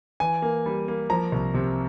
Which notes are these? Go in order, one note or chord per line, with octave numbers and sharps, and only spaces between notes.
E3 G#5
A#3
G3
A#3
F3 A#5
C2
C3